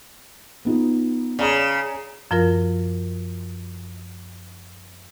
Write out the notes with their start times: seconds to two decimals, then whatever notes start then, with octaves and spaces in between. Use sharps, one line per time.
0.65 B3 D#4 F4
1.39 C#3 D5 A#5 D#6
2.31 F#2 F3 F4 A#4